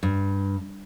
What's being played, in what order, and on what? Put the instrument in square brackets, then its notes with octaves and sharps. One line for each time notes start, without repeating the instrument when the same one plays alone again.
[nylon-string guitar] G2